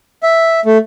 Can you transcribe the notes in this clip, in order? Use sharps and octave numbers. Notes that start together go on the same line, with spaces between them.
E5
A3